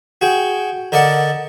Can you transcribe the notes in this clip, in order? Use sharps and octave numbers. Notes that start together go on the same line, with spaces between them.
F#4 G#4 G5
D3 A#4 D5 D#5 F#5 A5